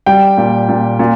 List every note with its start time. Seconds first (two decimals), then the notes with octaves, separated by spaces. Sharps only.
0.06 G3 G5
0.37 A#2
0.69 A#2
0.99 A#2